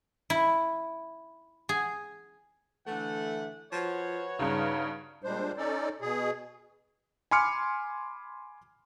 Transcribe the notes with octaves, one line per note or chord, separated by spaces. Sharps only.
E4
G#4
D3 E3 A3 F#5
F3 F#4 B4 C#5
G2 C#3 D#4
A#2 G3 G#3 D4 C5
C#4 D#4 A4 D5
B2 G#4
G#5 B5 C6 D6 F6 C#7